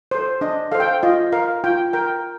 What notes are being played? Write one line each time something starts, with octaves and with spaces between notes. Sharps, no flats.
A4 C5
D4 D#5
A4 C5 F5
G5
F5
F4 D#5
A#4 F5
F4 G5
A#4 G5